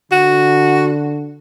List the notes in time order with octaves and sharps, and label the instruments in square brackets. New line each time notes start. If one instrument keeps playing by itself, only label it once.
[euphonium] D3 [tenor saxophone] F#4